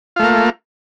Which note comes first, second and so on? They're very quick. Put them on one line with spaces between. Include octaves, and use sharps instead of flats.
F4 A3 A#3